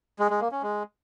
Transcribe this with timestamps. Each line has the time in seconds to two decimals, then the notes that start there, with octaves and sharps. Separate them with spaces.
0.19 G#3
0.30 G#3
0.41 A#3
0.52 C#4
0.63 G#3